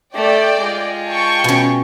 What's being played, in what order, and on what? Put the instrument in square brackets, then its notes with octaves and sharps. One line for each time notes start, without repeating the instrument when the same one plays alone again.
[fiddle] A3 [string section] D5 G5
[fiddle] G#3 F4
[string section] G5 A5 C#6
[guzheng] B2 C#4